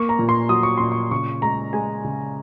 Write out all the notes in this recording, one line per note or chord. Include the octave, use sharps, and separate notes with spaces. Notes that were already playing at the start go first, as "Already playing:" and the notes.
Already playing: A#3 C#6
A#5
A#2
C6
F#3 D#6
C#6
A#2 C6
C#6
C#3 C#6
G#3 A#5
G#3 G#5
C#3